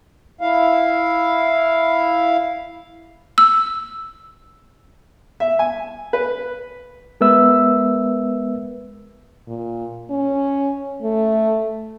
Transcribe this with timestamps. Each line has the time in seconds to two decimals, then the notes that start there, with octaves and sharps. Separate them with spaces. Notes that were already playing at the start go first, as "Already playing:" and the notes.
0.41 E4 F5
3.38 E6
5.40 E5
5.59 G#5
6.13 B4
7.21 G#3 B3 A#4 B4 E5 E6
9.47 A#2
10.10 C#4
11.02 A3